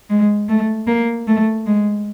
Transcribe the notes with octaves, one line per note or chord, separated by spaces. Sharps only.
G#3
A3
A#3
A3
G#3